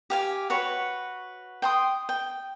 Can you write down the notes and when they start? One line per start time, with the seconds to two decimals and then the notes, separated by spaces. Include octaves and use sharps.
0.10 G4 F5 G#5
0.50 F#4 B4 C#5
1.62 G5 C6 D#6
2.09 G5